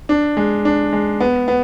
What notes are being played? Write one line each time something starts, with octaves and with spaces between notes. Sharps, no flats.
D4
G#3
D4
G#3
B3
B3